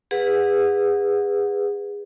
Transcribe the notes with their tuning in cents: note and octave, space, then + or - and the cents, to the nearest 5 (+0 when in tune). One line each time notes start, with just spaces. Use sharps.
G#4 -25 B4 +0 F#5 -25